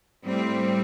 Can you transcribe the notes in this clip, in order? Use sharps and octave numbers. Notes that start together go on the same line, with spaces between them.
A2 G3 C4